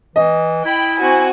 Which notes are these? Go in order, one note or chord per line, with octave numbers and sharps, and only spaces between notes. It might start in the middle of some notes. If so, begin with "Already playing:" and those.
E3 D#5
E4 G5 B5
C4 F#4 G#5